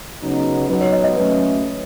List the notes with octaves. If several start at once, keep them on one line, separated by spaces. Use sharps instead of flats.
C#3 F#3 B3 D#4
F#3 B3 D#4 B4
C#5
D#5
D#5
F#3 A3 C#4 B4